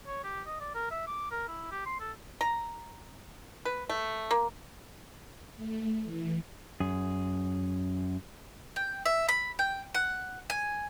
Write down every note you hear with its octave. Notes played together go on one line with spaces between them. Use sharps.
C#5
G4
D#5
D5
A#4
E5
D6
A#4
E4
G4
C6
A4
A#5
B4
A3
A#3
A3
E3
F#2 G#4
G5
E5
B5
G5
F#5
G#5